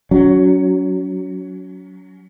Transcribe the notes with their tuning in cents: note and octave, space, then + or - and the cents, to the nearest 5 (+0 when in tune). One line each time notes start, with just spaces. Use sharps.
F#3 +5 C#4 +35